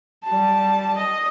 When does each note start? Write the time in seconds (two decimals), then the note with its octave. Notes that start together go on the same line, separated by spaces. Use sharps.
0.24 G3 A5
0.97 D#5